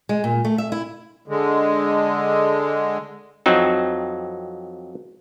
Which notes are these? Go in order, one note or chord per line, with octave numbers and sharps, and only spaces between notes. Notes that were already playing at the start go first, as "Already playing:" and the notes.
G#3
A#2
A3
E5
E4
D3 G#3
F2 F#3 C4 D#4